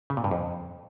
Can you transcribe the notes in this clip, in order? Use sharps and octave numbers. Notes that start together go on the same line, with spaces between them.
C#3
A#2
G2
F2